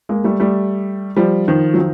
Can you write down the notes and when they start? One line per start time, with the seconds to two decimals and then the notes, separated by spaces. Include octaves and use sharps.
0.09 G#3 A#3
0.24 G3 A3
0.40 G3 A3
1.16 F3 G3
1.48 D#3 F3
1.74 F#3
1.78 D#3 F3